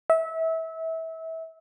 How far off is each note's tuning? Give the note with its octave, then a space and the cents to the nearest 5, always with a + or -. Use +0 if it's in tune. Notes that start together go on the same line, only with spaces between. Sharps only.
E5 -25